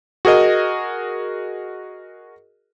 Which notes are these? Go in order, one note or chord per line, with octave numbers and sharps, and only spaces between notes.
F#4 G#4 A#4 D#5